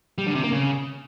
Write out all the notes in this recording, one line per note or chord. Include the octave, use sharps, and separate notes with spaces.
G3
D3
C3
A#3
C#3